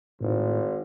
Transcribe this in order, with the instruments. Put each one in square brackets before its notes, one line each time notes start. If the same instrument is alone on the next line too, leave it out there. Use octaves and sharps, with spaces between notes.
[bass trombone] G#1 [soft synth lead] A2